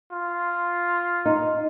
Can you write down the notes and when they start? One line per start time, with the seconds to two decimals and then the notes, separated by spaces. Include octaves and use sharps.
0.12 F4
1.26 D#4